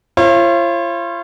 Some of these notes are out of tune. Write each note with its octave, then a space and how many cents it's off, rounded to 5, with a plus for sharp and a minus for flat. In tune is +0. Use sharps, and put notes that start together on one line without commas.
F4 -40 C#5 -45